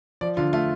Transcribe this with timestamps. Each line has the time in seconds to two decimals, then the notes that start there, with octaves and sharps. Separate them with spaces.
0.21 F3 D5
0.37 D3 F4
0.53 A3 F4